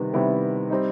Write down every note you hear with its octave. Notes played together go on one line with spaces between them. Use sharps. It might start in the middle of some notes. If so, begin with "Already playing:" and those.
Already playing: C3 D#3 G3 B3
C3 D#3 G3 B3 E4
G3 C4 D#4